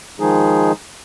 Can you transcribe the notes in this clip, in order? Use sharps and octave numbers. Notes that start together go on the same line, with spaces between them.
D#3 F3 G#3 D#4 G#4